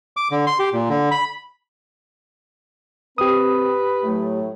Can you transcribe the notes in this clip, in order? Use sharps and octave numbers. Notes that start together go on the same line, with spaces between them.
D6
D3
C6
G4
A#2
D3
B5
C4 G4 B4 D#6
A2 F#3 A3